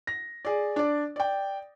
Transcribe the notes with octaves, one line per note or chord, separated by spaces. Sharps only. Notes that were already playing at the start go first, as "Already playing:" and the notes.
A#6
G#4 D5
D4 D5
D5 G5